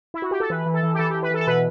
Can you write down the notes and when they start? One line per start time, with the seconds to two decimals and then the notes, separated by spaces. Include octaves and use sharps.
0.14 E4
0.22 F#4
0.31 G4
0.40 A4
0.50 E3 B4
0.66 E3
0.74 A4
0.83 E3
0.94 G4
0.99 E3 A4
1.10 G4
1.14 E3
1.23 B4
1.31 E3 A4
1.41 A4
1.47 B2 B4